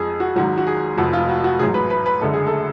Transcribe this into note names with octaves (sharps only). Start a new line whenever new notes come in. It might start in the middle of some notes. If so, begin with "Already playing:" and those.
Already playing: F2 F3 G#3 G#4
F#4
G#1 G#2 F#3 F#4
F#4
G#4
F1 F2 F3 F#4
F4
F#4
F#4
A1 G#2 F#3 G#4
B4
B4
B4
F#1 F#2 D3 G#3 A4
G#4
A4